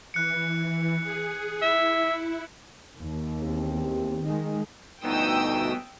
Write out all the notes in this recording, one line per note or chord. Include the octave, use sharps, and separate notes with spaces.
E3 F#6 C#7
G#4
E4 E5
D#2
E2 C4 G4
D#3 G#3
D2 G2 B2 B3 D#4 G5 D#6 E6